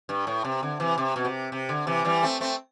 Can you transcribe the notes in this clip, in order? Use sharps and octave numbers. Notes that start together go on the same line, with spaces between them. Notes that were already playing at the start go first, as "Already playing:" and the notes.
G2
A2
C3
D3
C3 E3
C3
B2
C3
C3
D3
C3 E3
E3 G3
A3 C4
A3 C4